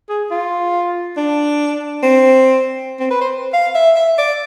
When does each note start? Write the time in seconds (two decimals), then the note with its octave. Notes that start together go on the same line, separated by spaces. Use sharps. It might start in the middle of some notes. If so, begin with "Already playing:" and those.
0.09 G#4
0.31 F4
1.17 D4
2.03 C4
3.00 C4
3.11 B4
3.21 C5
3.54 F5
3.75 E5
3.96 E5
4.18 D5